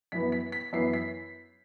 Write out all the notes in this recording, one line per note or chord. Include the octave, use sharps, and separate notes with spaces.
F#2 E3 B3 B6
B6
B6
F#2 E3 B3 C7
B6